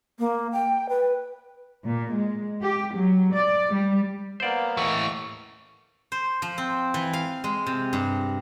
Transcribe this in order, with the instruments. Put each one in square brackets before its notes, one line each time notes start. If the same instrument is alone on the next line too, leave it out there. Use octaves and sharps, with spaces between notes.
[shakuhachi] A#3
G5
B4
[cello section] A#2
G#3
G4
F#3
D5
G3
[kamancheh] A#3 B3 [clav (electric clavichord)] C5 D5
[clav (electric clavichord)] D#2 [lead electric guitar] E3 A3 [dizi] C#6
[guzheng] C5
F3
C4
E3
F5
G#3
C3
G2